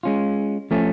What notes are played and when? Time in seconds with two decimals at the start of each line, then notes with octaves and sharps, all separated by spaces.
0.03 G#3 C#4 F4
0.71 F3 A3 C#4